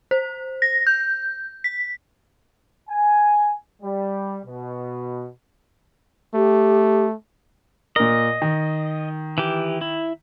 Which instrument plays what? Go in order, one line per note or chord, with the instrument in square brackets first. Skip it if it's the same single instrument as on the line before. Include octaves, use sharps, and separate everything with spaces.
[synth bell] C5
A#6
G6
B6
[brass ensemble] G#5
G3
B2
[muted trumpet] A3 [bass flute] G4
[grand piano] A#2 A#4 [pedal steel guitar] D#5
[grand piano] D#3
[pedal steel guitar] E3 G4
E4